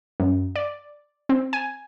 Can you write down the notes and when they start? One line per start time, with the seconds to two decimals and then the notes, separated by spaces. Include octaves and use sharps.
0.20 F#2
0.56 D5
1.29 C4
1.53 G#5